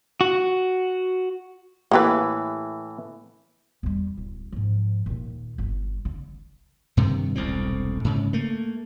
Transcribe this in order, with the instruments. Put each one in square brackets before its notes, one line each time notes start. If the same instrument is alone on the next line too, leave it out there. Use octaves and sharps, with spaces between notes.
[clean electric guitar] F#4
[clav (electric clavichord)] A2 E3 [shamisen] A#3 G4 B4
[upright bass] E2 G3
D1
G#2 F3
D#2 A#2
G1 G2
D3
[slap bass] G2 C3 D#3
E1 C2 A2 C4
G#2 C#3
A3 A#3